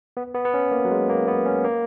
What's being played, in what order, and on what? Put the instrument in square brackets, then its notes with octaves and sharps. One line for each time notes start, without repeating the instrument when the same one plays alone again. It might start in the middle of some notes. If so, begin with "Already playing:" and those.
[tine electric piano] B3
B3
B3
C#4
A#3
F#3
G#3
A#3
B3
C#4
A#3